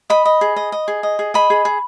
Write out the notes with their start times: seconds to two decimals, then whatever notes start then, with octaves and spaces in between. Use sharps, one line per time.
0.10 D#5 B5
0.25 D#5
0.41 G#4
0.56 D#5
0.72 D#5
0.88 G#4
1.03 D#5
1.19 G#4
1.34 D#5 B5
1.50 G#4
1.65 G#4